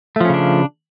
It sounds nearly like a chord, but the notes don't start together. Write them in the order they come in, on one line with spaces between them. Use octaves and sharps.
A3 F3 C#4 C#3 D4